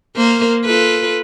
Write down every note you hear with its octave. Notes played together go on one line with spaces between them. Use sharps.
A#3 A#4 C5
F4 A4 B4